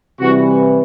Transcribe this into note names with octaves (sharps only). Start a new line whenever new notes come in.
C3 E3 G3 F#4